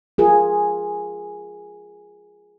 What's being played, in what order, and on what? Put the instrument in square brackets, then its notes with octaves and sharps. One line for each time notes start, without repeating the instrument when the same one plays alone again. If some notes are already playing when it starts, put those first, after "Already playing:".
[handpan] F4 G#4 A#4